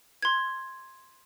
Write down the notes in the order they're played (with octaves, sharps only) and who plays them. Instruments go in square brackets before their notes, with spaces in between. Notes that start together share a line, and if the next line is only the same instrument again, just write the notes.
[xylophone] C6 G#6